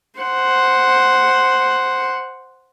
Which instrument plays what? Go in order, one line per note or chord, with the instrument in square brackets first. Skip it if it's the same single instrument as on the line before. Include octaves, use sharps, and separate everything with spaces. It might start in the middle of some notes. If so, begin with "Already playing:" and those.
[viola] C5 F#5